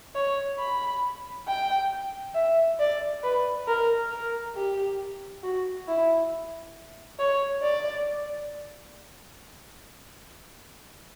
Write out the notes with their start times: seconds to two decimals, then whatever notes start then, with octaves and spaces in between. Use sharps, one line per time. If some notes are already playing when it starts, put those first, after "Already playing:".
0.15 C#5
0.60 B5
1.48 G5
2.35 E5
2.80 D5
3.24 B4
3.68 A#4
4.11 A#4
4.56 G4
5.44 F#4
5.88 E4
7.20 C#5
7.63 D5